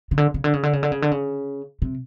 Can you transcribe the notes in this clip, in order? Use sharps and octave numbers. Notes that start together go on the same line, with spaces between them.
C#3
D3
C#3
D3
C#3
D3
C#3
D3
C#3
D3
C#3
C3